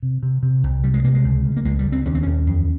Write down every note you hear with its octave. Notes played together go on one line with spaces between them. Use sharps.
C3
C3
C3
C2
C3 G3
G#3
C3 A#3
G#3
C#2
C#3
A#3
C#2 G#3
G3
C#2
C4
D#2 C#4
C4
D#2 C#4
F2